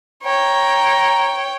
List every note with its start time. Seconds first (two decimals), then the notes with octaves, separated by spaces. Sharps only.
0.23 C#5 G5 A#5